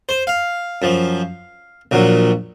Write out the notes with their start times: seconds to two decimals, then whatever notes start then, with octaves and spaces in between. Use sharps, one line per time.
0.09 C5
0.27 F5
0.82 F#2 F3
1.91 A#1 A#2 F#3